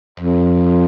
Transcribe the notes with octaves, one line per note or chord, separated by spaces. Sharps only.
F2